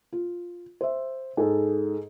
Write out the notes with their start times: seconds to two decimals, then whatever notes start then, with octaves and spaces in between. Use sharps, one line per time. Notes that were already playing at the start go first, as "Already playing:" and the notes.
0.13 F4
0.81 C5 E5
1.37 G#2 G#4 A4